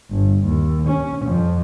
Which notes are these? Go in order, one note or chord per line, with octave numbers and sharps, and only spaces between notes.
G1
D#2
C#4
F2